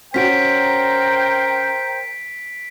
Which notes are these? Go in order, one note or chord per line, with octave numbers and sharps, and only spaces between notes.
C#4 F#4 A#4 C5 G5 B6 D7